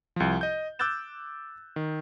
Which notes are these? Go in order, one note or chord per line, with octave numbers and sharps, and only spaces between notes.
C2 F3
D#5 G6
D6 E6 F#6 G6 A6 E7
D#3